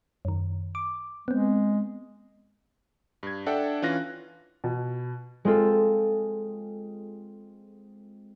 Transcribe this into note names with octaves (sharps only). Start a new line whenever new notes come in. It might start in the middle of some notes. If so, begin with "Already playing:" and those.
F#2 D#3
D6
G#3 B3 C4
G2 G#6
D4 A4 E5 F#5 G5
E3 C#4 F4 F#6 A#6
B2
G#3 C4 F4 A4